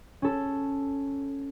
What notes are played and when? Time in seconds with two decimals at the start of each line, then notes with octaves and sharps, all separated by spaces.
0.22 C#4 A4